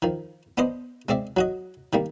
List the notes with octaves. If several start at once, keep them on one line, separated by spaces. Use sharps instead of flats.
D#3 F3
B3 D4 C5 D#5
G#3 C4 D5 E5
F#3 F#4 D#5
D#3 G3 A#3